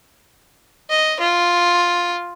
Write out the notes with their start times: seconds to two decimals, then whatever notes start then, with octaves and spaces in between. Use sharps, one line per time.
0.90 D#5
1.20 F4